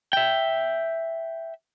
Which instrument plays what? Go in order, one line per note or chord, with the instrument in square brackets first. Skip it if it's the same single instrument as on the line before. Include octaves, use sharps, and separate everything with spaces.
[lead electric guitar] E5 G5